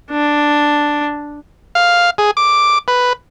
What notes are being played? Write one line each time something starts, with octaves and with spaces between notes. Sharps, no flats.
D4
F5
G#4
D6
B4